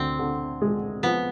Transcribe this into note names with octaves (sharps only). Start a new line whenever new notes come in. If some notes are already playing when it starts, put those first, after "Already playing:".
Already playing: D2 C4
D3
G#3
F3 B3